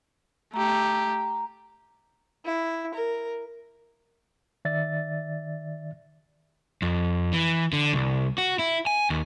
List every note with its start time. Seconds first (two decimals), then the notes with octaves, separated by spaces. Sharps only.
0.54 A3 G4 A#5
2.45 E4
2.94 A#4
4.65 D#3 D5 E5 A6
6.82 F2
7.33 E3
7.73 D3
7.93 C2
8.38 F#4
8.59 E4
8.87 G#5
9.10 D#2